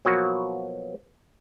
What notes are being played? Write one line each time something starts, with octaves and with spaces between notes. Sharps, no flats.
B2 F3 F#3 A#3 B3 F#4